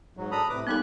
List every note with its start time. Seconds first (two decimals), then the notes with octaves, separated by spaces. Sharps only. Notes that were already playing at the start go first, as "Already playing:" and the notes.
0.17 G#2 F#3
0.31 D4 A4 A#5 B5 D#6
0.50 A2 C3 B4 D6 D#6
0.67 G3 A#3 B3 D#4 G4 A4 F#6